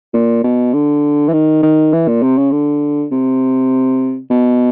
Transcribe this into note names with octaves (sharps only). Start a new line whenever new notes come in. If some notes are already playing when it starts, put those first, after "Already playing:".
A#2
B2
D3
E3
D#3
D#3
E3
A#2
C3
C#3
D3
C3
B2